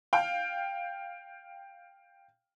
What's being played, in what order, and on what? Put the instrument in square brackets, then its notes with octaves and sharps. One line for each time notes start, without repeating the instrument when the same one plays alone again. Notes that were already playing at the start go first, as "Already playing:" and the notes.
[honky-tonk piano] F5 G5